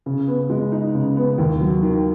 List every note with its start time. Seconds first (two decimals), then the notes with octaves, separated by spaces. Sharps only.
0.06 C#3
0.28 B3
0.50 G#3
0.72 D#4
0.95 C#3
1.17 B3
1.38 D#2
1.61 F#3
1.83 D#3